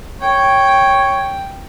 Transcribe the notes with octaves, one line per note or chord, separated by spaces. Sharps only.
C#5 G5